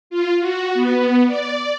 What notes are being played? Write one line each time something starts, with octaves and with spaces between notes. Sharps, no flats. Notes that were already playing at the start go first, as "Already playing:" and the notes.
F4
F#4
B3
D5